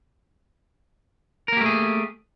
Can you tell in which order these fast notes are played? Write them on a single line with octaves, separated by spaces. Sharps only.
A#4 A#3 G4 A3 G#4